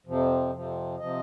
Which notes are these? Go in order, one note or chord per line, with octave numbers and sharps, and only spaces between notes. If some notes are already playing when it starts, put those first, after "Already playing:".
F2 C3 F3
F2 C3 F3
C3 F3 D#5